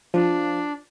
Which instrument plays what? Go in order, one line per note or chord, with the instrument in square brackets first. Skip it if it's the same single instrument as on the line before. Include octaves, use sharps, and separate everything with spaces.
[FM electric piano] F3 [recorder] D4